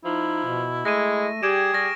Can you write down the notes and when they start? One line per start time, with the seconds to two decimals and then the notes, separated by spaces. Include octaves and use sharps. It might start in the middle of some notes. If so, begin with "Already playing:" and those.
0.05 F3 D#4 E4
0.45 B2
0.85 G#3 A3 A#6 D#7
1.43 G3 G4 G#4 G#6 D7 E7
1.73 G3 C#6 F6 A#6